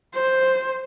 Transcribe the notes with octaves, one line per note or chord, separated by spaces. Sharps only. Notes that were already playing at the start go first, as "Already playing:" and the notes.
C5